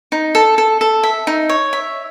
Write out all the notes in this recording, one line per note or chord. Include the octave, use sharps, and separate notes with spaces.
D#4
A4
A4
A4
E5
D#4
C#5
E5